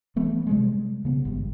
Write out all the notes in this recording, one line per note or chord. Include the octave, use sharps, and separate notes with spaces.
E3 A3 B3
C3 G3 G#3
C#3 B3
G#1 G2